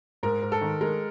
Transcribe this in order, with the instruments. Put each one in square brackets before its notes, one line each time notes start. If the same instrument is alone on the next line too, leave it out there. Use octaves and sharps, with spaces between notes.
[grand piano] G#2 [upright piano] A#4
[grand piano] G#2
[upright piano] A4
[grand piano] D#3
[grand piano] G#3 [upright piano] A#4